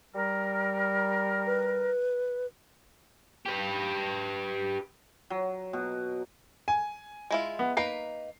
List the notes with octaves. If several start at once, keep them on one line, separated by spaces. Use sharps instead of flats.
G3 A#4
B4
G4 B4
F#3
B2
G#5
G#3 E4 F4
B3
A#3 D#4 B4 C7